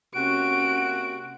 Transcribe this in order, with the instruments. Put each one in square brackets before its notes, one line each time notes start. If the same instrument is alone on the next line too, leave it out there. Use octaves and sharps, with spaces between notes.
[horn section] C3 A#3 F#4 [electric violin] C#4 D7